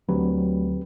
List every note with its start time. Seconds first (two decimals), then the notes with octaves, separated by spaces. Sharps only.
0.09 D2 F#3 C4 G4 B4